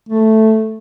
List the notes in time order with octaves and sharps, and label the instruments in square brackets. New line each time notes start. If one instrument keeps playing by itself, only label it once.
[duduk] A3